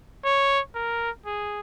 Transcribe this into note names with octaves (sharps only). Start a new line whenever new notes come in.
C#5
A#4
G#4